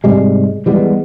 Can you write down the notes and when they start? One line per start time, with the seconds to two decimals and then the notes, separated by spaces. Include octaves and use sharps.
0.04 G#2 C3 G3 G#3
0.66 E3 G3 G#3 B3